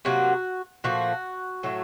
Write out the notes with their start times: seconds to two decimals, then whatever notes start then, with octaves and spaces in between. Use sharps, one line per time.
0.05 C3 F#3 A#3 F#4
0.84 A#2 F3 A3 F#4
1.63 A2 F#3 A3